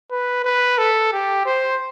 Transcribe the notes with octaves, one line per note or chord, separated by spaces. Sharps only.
B4
B4
A4
G4
C5